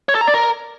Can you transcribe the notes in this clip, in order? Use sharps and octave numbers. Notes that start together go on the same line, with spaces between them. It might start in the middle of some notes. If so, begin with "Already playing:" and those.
C#5
A4
A#5
D5
A#4